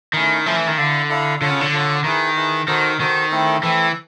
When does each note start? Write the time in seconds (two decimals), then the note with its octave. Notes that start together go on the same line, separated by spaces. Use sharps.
0.13 D#3 A3 C#4 E4
0.46 F3 A3 C#4 E4
0.56 E3
0.67 D#3
0.77 D3 E4 A4 D5 F5
1.09 E4 A4 D5 F5
1.41 D3 F4 A4 C#5 F#5
1.51 C#3
1.61 D3
1.73 F4 A4 C#5 F#5
2.04 D#3 E4 G#4 B4
2.36 E4 G#4 B4
2.68 D#3 D#4 F#4 A4 C5
3.00 D#3 D#4 F#4 A4 C5
3.31 A3 C4 E4 A4
3.63 E3 A3 C4 E4 A4